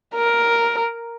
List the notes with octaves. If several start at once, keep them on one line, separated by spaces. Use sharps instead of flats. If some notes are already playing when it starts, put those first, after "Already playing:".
A#4